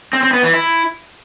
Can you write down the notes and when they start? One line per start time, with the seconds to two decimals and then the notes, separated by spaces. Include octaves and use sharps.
0.13 C4
0.23 C4
0.33 B3
0.43 E3
0.53 E4